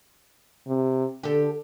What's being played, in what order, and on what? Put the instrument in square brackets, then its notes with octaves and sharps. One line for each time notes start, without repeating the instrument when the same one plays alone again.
[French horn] C3
[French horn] D3 [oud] G4 A4